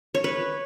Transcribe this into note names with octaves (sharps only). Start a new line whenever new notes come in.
C#5
B4